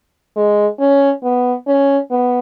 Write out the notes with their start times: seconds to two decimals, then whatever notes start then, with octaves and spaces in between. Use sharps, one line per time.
0.36 G#3
0.80 C#4
1.24 B3
1.67 C#4
2.11 B3